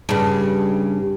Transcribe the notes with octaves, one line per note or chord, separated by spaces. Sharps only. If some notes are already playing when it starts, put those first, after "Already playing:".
G2 C#3